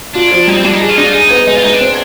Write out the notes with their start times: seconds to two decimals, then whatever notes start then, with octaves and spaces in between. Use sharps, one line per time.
0.15 D4 F4
0.32 F3
0.48 G3 D#4
0.56 C4
0.65 G3 D4
0.73 D#4
0.81 D4 G#4
0.89 F4
0.98 D4 D#4
1.05 F4
1.14 D#4 G#4
1.31 B3
1.47 G#3 D#4
1.56 F4
1.63 G#3 D#4
1.72 D4
1.81 C4